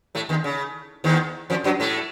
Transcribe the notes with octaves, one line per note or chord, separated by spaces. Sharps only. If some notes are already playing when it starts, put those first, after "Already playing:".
A2 A3
D#2 D#3
C#3
D#2 D#3
F2 F3
F#2 F#3
A2 A3